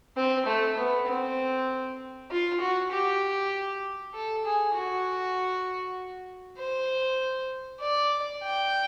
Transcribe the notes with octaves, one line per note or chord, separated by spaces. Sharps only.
C4
A3
B3
C4
F4
F#4
G4
A4
G#4
F#4
C5
D5
G5